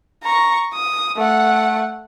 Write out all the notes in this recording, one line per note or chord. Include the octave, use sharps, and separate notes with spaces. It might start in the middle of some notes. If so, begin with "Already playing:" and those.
A#5 C#6
D#6
A3 F#5